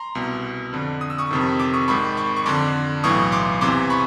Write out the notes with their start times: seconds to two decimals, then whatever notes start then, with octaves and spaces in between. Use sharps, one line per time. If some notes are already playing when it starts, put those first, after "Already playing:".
Already playing: A#5 C6
0.15 C2 B2
0.73 F2 D3
1.01 D#6
1.10 E6
1.18 C#6 D#6
1.31 F2 C3 D#3
1.59 D6 E6
1.74 C#6 D#6
1.88 G#1 G#2 D#3 B5 C#6
2.17 B5 C#6
2.36 C#6
2.46 F2 D3 C6 D6
3.04 B1 A2 E3 C#6 D#6
3.32 C6 D6
3.61 E2 C3 E3 C6 D6
3.90 B5 C#6